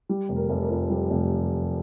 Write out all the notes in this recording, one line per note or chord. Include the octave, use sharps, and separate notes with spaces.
G3
F1
A#4
F1
A#4
F2
G3
F1